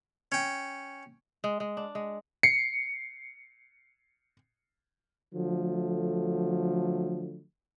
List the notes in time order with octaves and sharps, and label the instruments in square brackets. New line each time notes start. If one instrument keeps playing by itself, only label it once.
[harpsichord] C#4 G5
[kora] G#3
G#3
D4
G#3
[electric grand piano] C7 C#7
[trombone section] D3 F3 F#3 A3